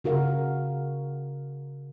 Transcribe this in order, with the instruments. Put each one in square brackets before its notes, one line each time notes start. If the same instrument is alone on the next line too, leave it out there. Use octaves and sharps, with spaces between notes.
[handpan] C#3 F#4 A#4 F5